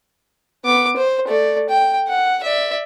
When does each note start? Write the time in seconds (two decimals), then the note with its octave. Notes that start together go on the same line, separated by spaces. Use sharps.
0.65 B3 D6
0.96 C5
1.28 A3 D5
1.69 G5
2.08 F#5
2.43 D5 E5